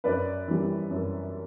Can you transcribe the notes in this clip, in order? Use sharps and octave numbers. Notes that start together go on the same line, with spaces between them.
F#2 B4 D5
E3 G3
F#2